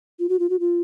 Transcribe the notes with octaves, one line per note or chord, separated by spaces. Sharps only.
F4
F#4
F4
F#4
F4